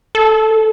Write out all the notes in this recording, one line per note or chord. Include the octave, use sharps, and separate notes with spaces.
A4